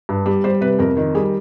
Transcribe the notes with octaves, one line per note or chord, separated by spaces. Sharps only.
G2
G3
G3 C5
C3 B4
F2 A#4
D#3
G3 G#4